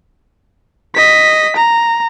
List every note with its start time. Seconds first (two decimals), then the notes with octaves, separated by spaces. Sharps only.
0.96 D#5 B6
1.57 A#5